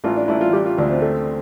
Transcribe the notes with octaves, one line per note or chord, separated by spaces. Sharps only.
A1 F4
D4
A1 E4
F4
G3 G4
F4
D2 D4
C4
A3